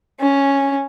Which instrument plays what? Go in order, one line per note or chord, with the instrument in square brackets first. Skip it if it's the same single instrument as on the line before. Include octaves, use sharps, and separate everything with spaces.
[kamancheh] C#4